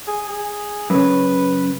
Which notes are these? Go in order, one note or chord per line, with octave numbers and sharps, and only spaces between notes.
G#4
G#4
F#2 C#3 B4